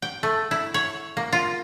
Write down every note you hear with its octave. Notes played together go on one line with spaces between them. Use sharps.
G5
A3
E4
C#5
A#3
F4